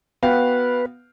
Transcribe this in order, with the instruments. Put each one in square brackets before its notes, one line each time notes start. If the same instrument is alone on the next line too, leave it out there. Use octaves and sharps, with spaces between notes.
[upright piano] B3 [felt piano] F#4 F5 G5 [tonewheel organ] B4